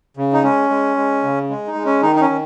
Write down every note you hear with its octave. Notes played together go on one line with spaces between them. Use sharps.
C#3
D#4
G#3 C#4
G#3
G#3
C#3
G#3
D#4
G#3
C#4
D#3 D#4
D#4
C#4
D#3